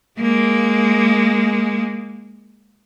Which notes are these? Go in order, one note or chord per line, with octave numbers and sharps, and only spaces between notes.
G#3 A#3